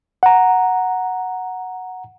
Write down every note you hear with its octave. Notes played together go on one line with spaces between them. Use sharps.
F#5 A#5